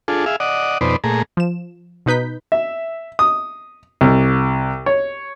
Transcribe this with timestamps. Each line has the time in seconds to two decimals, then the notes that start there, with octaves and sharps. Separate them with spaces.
0.08 D4 F4 G#4 A4
0.26 G#4 E5 F5
0.40 D5 D#5 F#5
0.81 F2 B2 D#4 B4 C5 D5
1.04 A#2 A3 G#4 A#5
1.37 F3 E7
2.06 B2 D#4 B4 G6 B6
2.52 E5
3.19 D#6
4.01 C2
4.86 C#5